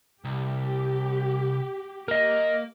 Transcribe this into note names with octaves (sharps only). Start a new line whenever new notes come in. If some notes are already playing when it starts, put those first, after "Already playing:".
C2 G4
A#3 A#4 D#5